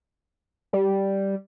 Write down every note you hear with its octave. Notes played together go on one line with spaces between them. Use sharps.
G3